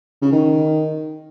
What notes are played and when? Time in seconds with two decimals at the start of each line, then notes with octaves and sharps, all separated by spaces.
0.22 C#3
0.32 D#3